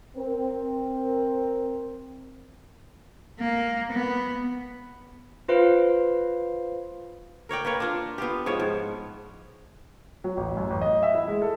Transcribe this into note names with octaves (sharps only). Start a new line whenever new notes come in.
C4 A#4
A#3
B3
F4 B4 C5 F5
A#4 C#5 D5 G5
A#3 B4 C#5
D4 F4
B3 F4 G4
G#2 F3 C#5
G#2
F#3
A1
F#2
A1
D#5
E5
E4
G#3
A4